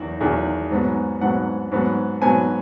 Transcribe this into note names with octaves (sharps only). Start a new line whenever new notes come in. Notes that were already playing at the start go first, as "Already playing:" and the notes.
Already playing: E2 D#3 F#3 F#4
E2 D#3 F#3 G#4
G#2 F#3 B3
G#2 F#3 B3 F#5
G#2 F#3 B3
G#2 F#3 B3 G#5